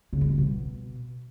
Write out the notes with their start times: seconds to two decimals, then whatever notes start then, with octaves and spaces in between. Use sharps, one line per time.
0.13 C#3
0.21 F#3
0.29 G3
0.38 B2